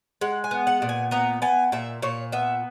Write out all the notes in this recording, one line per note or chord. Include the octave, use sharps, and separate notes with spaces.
G#3 F#5
G#5
B3
F#5
A#2
G#5
B3 A#5
B3 G#5
A#2 E5
A#2 C#5
B3 E5